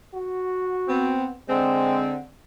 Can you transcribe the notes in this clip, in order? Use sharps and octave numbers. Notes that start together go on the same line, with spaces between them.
F#4
B3 C4
D3 G#3 C4